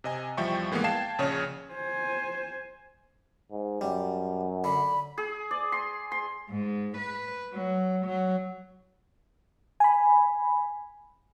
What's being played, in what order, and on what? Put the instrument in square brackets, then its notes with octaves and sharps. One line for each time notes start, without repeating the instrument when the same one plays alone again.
[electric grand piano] C3 D#5 G#5
E2 F3 G3 E5 G5 C#6
A2 E3 G#3 A#3 B3
F5 G5 A5 G#6 C7 E7
A#1 C#3 G#4 C#5
[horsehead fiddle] C5 G#5
[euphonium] G#2
[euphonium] F#2 [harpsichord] G3
[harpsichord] D3 [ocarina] B5
[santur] G#4
D5
C6
C6
[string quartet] G#2
B4
F#3
F#3
[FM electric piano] G#5 B5